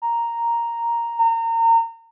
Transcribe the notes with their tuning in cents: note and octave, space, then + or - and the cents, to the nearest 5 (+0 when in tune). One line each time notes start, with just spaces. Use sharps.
A#5 +0
A#5 -30